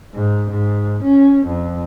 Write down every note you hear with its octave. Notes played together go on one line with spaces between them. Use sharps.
G#2
G#2
C#4
F2